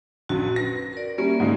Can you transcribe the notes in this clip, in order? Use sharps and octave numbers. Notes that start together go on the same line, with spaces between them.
A#1 F#2 F#4
B4 A#6
A#4 D5
G3 A#3 C#4 E5
G#2 C#3 G#3